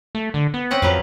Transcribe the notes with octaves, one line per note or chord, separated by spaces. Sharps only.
A3
D3
B3
C4 C#4 F#5
F2 F#3 B4 F5